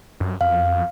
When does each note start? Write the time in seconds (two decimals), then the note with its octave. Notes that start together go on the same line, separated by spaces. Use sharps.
0.20 F#2
0.41 F2 F5